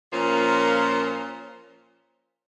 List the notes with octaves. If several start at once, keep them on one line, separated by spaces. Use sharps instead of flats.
A#2 F3 A#3 C#4